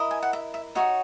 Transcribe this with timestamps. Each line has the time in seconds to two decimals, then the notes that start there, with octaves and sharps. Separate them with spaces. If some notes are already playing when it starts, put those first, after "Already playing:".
Already playing: E4 A#4 D#5
0.11 G#5
0.23 F#5
0.33 E5
0.54 E5
0.75 D#4 F#4 C#5 E5